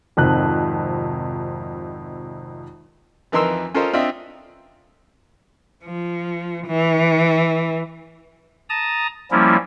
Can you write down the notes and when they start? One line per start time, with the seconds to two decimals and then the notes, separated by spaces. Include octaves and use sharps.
0.17 G#1 F2 C3 F#6
3.32 F2 E3 D#4 A#4 C6 E6
3.74 C#4 F4 A4 A#4 C5 D#5
3.93 C4 D4 F4 D#5 E5
5.85 F3
6.67 E3
8.69 A5 A#5 D#6
9.31 F3 G3 A#3 C#4 E4